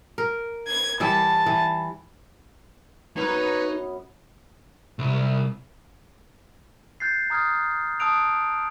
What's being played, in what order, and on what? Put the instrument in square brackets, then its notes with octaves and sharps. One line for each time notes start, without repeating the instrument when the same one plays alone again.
[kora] A#4
[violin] G#6
[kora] E3 G3 E4 [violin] A5
[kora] E3
[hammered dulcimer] F#2 B3 A#4 [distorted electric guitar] D#4 A#5 [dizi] B4 [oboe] C#5
[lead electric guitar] C2
[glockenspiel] F#6 G6 A6 C7
A#5 D#6 F6 F#6 G#6
A5 D#6 E6 F#6 D7 F7